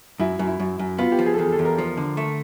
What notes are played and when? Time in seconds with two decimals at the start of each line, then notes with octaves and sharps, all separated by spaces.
0.20 F#2 E4
0.39 F#2
0.47 E4
0.60 F#2
0.79 F#2
0.98 B3 F4
1.12 G4
1.19 F3
1.26 G#4
1.34 A4
1.38 E2 G#4
1.52 A4
1.59 E2
1.65 A#4
1.78 F3
1.97 D3
2.17 A3